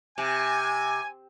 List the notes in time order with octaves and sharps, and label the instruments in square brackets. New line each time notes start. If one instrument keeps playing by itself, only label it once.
[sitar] C3 [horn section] G#5